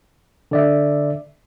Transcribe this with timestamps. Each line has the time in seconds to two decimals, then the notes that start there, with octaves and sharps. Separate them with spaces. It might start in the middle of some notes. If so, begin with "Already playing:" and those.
0.51 D3 D5 E5